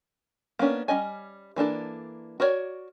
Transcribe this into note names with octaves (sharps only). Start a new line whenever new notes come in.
A#3 B3 C#4 D4
G3 C#4 D#5 G#5
E3 A#3 D4 A4
F#4 A#4 B4 C#5 D5